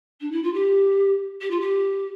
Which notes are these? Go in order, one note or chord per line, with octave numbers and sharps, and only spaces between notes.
D4
E4
F4
G4
G4
F4
G4